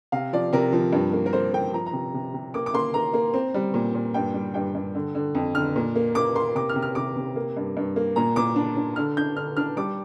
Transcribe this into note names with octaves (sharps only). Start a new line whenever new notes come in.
C3 F5
F3 D5
C3 A#4
F3
G2
A#3
A#4
A#3 C5
A#3 G5
F3 A#5
A#5
C3
C3
C3
A#3 D6
D6
A#3 C6
A#3 A#5
A#3
C4
G3
A#2
A#2
G2 G5
G3
G2 G5
G2
D3
D3
F2
D3 F6
A#2
A#3
A#3 D6
A#3 C6
C3 D6
F6
C3
F6
C3 D6
C3
A#3
G2
G2
A#3
A#2 A#5
A#2 D6
D4
D4
D3 F6
D4 G6
D3 F6
D4 F6
G3 D6